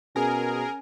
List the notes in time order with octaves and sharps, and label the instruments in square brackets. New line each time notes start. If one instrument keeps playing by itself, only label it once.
[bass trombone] B2 [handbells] C#4 G#5 [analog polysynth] G#4 A#4